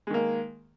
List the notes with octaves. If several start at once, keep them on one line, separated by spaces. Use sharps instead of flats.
D#3 G#3 A#3